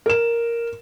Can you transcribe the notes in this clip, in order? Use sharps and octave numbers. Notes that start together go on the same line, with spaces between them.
A#4 E7